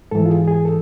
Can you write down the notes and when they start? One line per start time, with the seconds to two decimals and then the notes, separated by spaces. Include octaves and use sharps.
0.11 G#2 E3 A4
0.26 F4
0.30 G#4
0.48 G#4
0.65 A4